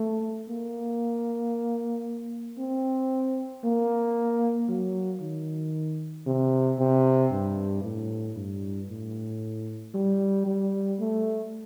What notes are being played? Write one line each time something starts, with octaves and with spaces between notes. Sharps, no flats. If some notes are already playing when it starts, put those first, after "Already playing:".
Already playing: A3
A#3
C4
A#3
F#3
D#3
C3
C3
G2
A2
G2
A2
G3
G3
A3